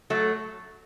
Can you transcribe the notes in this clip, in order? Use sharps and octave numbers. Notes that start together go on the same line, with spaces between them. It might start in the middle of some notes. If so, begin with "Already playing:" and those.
F#3 A3